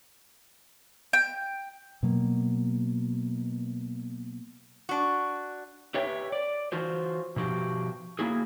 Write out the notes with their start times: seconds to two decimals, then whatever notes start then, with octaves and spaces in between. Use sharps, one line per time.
1.13 G5
2.03 B2 F#3 A#3
4.89 D4 F#4
5.94 G4 B4 C#5 E5 G5
6.32 D5
6.72 E3 F4 F#4 C5
7.36 B2 F3 F#4 G4
8.19 A#3 E4 F#4 G#4